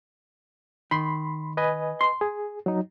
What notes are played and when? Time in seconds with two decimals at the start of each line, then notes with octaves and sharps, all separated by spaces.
0.91 D#3 B5 C6
1.57 B4 D#5 G#5
2.01 C6
2.21 G#4
2.66 F#3 D#4